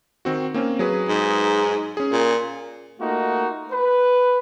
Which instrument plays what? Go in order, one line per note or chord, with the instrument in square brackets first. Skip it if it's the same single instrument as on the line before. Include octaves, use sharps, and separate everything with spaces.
[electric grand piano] D#3 C4 F#4
A#3 C4 C#4
F#3 G#4 B4
[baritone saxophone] G#2
[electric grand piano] C#4 G#4
[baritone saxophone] A#2
[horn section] A3 A#3 D#4 F4 F#4
B4